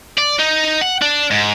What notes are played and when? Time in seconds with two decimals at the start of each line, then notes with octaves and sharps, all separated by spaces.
0.18 D5
0.39 D#4
0.81 F#5
1.02 D4
1.31 G#2